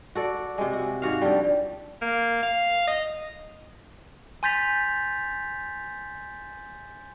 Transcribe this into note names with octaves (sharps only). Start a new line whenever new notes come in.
F#4 A4 D5
C3 G#3
F#4
G#2 F#4 F5
D3 F3 G3
A#3
F5
D#5
G#5 C6 G6 A6 B6 F7